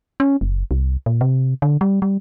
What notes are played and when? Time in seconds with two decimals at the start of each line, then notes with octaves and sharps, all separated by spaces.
0.20 C#4
0.41 F#1
0.71 C2
1.06 A#2
1.21 C3
1.62 D3
1.81 G3
2.02 G3